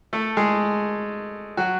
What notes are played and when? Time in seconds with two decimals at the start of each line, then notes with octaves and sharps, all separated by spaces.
0.13 A3 A4
0.37 G#3 G#4
1.57 F#3 F#4